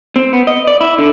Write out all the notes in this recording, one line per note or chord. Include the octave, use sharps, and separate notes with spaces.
C4
B3
D#5
D5
E4
D3